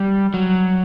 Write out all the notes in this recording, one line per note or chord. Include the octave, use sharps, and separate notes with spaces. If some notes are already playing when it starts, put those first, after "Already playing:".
Already playing: G3
F#3